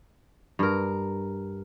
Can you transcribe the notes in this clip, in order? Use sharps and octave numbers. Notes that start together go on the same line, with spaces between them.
G2 A#4